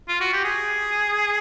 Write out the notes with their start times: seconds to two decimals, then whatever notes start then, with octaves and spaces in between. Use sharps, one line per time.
0.09 F4
0.21 F#4
0.33 G4
0.44 G#4